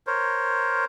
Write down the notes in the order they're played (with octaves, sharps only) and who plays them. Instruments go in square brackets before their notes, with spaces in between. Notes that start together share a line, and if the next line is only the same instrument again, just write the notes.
[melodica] A#4 C5 C#5